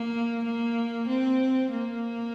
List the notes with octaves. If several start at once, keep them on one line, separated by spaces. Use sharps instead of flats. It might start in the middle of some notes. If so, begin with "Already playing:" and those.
Already playing: A#3
A#3
C4
A#3